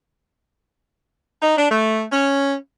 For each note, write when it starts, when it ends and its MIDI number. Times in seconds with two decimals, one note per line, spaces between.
1.42 1.55 63
1.57 1.69 62
1.71 2.04 57
2.12 2.55 61